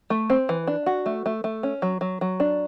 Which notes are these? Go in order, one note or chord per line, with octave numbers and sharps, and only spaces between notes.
A3
C4
E3
D4
F#4
A3
A3
A3
C#4
F#3
F#3
F#3
D4